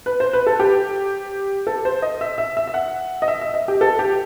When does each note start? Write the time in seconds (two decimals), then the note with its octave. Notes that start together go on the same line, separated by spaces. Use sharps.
0.06 B4
0.20 C5
0.33 B4
0.47 A4
0.60 G4
1.67 A4
1.85 C5
2.02 D#5
2.21 E5
2.38 E5
2.57 E5
2.67 E5
2.74 F#5
3.22 D#5
3.28 E5
3.41 E5
3.54 D#5
3.68 G4
3.81 A4
3.99 G4